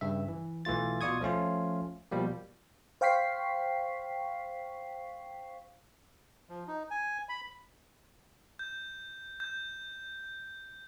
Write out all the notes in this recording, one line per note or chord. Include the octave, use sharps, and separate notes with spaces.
G2 C#3 E5
E3
B1 E3 A3 F4 A6
B2 F4 D5 C#6 D#6 G#6
F3 A3 C#4 F4
B2 F3 G3 A#3
C5 F5 G5 C#6 B6 C7
F3
D#4
G#5
B5
G6
G6